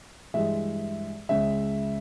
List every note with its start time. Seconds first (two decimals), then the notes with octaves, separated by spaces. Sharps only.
0.34 G2 E3 G#3 E5
1.29 C#2 C#3 G#3 E5